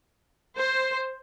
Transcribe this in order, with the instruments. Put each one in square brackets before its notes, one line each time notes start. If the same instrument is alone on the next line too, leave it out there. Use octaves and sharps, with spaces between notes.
[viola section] C5